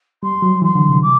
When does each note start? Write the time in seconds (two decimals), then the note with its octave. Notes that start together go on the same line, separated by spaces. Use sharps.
0.23 G3 C6
0.42 F#3
0.62 E3 C6
0.75 D3
0.89 C3
1.02 D6